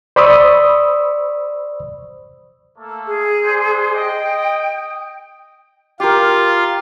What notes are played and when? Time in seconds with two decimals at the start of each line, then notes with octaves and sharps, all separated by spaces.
0.16 C5 D5 B5 C#6 D#6 E6
2.77 A3 A#3 A4
3.07 G#4
3.42 D4 C5
3.94 D#5 G5
6.00 F4 G4 A#4